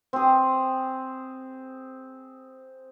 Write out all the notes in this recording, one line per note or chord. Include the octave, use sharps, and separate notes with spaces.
C4 G#4